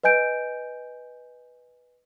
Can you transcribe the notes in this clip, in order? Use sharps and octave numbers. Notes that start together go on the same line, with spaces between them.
B4 D#5 G#5 G6 D7